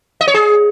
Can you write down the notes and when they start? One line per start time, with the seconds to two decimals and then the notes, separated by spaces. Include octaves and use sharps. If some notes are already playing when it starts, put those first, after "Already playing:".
0.21 D#5
0.27 C#5
0.34 G#4